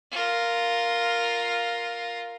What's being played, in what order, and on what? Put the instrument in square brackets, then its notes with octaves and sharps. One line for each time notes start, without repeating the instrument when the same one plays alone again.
[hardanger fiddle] F4 A#4